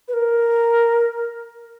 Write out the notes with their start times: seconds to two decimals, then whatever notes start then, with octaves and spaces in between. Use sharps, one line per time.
0.08 B4
0.13 A#4